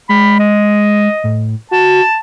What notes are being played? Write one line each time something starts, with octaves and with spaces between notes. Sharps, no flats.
G#3 B5
D#5
A2
F#4 A5